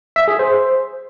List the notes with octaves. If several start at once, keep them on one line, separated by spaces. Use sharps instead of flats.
E5
G#4
C5